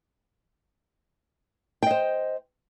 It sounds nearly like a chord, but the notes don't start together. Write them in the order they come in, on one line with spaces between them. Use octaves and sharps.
G5 D#5 C5